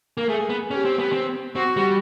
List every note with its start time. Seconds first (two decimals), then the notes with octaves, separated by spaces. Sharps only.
0.17 A#3
0.29 A3 G#4
0.50 B3
0.71 C#4 G4
0.85 C4
0.99 B3
1.12 C4
1.56 C4 F#4
1.77 G3